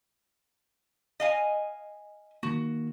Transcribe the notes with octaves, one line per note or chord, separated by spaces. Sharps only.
D#5 F5 G#5
D#3 A#3 F#4